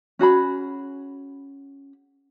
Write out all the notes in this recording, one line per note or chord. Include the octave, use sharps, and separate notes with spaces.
C#4 F#4 G#4 B5